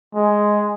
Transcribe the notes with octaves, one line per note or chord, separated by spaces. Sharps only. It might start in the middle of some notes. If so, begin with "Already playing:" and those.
G#3